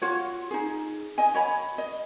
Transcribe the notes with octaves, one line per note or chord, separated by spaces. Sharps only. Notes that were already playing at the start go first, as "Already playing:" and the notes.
F4 F#4 C#5
D#4 G#4
D#5 G#5
F#4 C#5 B5
D#5